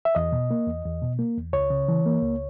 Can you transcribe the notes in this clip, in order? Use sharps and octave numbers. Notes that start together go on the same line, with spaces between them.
E5
E2 D#5
B2
A#3
E2
E2
B2
A#3
E2
C#2 C#5
C#3
E3
A#3
C#2